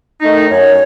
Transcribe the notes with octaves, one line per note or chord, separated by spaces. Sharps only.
D#3 A3 D#4
F#2 C#5